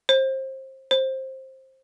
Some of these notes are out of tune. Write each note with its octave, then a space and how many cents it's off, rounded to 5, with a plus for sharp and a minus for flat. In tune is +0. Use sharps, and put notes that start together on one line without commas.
C5 +25
C5 +15